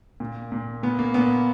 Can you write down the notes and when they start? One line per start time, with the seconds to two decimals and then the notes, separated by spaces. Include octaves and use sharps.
0.20 A#2
0.52 A#2
0.83 A#2 B3
0.99 A#3
1.14 A#2 B3